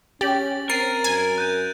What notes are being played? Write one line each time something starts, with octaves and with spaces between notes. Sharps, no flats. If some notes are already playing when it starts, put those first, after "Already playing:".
C#4 G4 A6 F#7
C4 A#4 A6 C7 D#7
F#2 G#5
F#6 G6 D#7